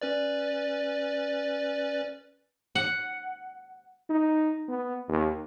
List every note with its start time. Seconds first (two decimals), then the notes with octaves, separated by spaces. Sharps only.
0.02 C#4 B4 D5
2.75 F#5
4.10 D#4
4.68 B3
5.08 D#2